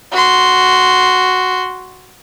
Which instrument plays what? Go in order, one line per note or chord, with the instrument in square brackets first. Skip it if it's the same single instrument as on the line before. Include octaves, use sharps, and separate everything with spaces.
[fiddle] F#4 C6